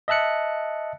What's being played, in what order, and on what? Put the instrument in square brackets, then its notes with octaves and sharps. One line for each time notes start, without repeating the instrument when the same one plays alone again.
[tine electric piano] D#5 E5 A5 F#6 C#7